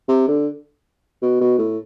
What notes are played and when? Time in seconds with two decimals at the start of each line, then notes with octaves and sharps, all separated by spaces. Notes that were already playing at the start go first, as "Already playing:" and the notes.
0.09 C3
0.28 D3
1.22 B2
1.41 B2
1.58 A2